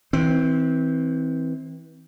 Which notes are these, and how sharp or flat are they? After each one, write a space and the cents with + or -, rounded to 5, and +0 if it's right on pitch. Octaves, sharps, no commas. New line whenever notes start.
E3 -30 C4 +0